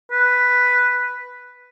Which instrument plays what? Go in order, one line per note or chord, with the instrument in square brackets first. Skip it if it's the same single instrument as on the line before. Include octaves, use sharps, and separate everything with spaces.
[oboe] B4